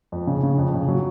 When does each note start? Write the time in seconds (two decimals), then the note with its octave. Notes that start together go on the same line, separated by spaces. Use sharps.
0.12 F2
0.27 C#3
0.43 C#3
0.58 F2
0.74 C#3
0.88 F#3